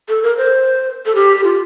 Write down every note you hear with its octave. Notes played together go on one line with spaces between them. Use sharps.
A4
A#4
C5
A4
G4
F4